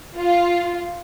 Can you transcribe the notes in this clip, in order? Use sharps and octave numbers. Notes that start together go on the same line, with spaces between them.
F4